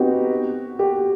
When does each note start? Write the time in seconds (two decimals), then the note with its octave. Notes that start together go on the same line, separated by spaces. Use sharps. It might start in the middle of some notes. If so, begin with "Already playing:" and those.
Already playing: B3 C4 D#4 F#4 G4
0.79 G4